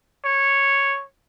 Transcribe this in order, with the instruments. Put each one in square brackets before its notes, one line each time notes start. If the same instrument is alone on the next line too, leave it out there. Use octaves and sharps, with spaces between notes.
[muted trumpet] C#5